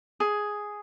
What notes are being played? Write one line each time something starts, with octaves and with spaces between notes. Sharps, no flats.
G#4